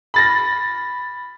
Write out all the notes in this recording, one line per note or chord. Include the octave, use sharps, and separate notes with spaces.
B5 A6 A#6